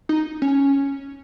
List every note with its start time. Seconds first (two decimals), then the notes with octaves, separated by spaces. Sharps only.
0.09 D#4
0.42 C#4